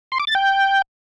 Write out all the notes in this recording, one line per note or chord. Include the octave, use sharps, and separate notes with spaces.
C6
D6
A6
G5